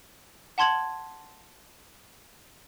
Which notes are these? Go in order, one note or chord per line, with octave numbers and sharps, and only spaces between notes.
F#5 A5 C6 G#6 F#7